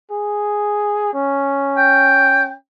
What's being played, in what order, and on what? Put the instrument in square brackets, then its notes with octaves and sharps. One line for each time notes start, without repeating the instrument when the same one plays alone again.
[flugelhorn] G#4
C#4
[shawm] G5